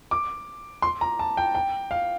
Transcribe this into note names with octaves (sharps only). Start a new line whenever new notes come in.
D6
C6
A#5
A5
G5
G5
F5